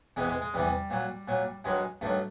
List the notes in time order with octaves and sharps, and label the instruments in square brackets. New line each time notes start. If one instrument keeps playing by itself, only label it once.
[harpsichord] E2 C3 E3 G#3
G#3
G#3
E2 C3 E3 G3
A#2 F#3
A#2 F#3
G2 D#3 F#3 G#3
G2 D#3 F#3 A3